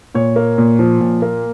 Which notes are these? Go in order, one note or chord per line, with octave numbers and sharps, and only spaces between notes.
A#2 C#5
A#3
A#2
F3
A#2
A#3